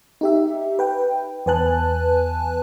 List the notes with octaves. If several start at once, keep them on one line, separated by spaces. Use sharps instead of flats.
D#4 G4 E5
B4 G5
E2 E3 B4 G#5 A5 F#6